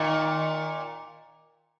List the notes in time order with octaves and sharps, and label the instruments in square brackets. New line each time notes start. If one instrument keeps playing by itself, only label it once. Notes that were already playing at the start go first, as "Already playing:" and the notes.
Already playing: [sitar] A#2 D#3